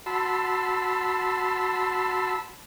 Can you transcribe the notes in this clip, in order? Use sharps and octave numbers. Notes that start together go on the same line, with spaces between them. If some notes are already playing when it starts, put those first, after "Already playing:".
F#4 A5 B5 C6 E6